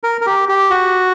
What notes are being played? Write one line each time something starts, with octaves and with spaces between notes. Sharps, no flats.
A#4
A#4
G4
G4
F#4